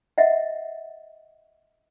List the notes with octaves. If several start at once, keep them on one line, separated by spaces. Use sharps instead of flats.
D#5 E5 F#5